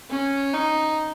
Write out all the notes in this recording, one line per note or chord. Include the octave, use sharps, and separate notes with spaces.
C#4
D#4